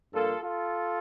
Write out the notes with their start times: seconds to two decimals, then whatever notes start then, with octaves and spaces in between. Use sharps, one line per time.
0.13 G2 F3 A#3 F4 A4
0.42 F4 A4